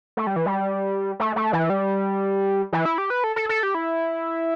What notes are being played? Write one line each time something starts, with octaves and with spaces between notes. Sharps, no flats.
A3
G3
E3
G3
A3
A3
E3
G3
E3
E4
G4
B4
A4
A4
A4
G4
E4